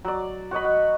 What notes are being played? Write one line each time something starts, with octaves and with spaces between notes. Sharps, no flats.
F#3 D5
F#4 C#5 D#5 B5
F#5